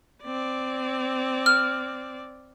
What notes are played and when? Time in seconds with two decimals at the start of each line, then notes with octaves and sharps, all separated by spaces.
0.24 C4 D5
1.46 F6